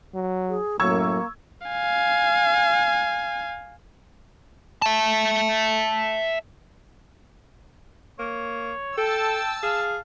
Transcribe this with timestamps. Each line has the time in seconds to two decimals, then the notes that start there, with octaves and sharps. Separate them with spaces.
0.14 F#3
0.49 G#4
0.80 F#2 A2 F#3 A#3 C#6 E6 G#6
1.68 F5 G#5
4.82 E5 A5
8.19 A#3 C#5
8.97 A4 G5 A5 E6
9.63 G#4 F5